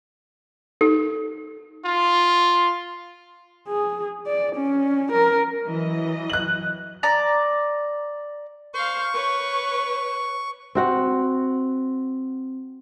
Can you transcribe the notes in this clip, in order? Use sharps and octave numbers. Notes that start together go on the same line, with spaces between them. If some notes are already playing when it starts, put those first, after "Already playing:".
D#4 A4
F4
G#4
D5
C#4
A#4
E3 F#3 D#5
F#6 F#7
D5 A#5
C5 F5 C#6
B4 C#5
C4 F#4 F#5